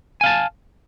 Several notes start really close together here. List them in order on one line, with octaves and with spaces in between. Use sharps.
G#5 F5 A5